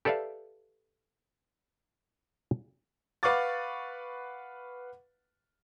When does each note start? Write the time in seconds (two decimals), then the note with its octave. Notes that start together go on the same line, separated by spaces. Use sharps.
0.05 G4 A4 B4 D5 E5 F5
3.23 B4 F5 F#5 C#6 D6 A6